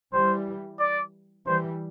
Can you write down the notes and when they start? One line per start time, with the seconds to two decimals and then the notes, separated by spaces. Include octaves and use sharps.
0.13 E3 G3 C5
0.79 D5
1.46 E3 G3 C5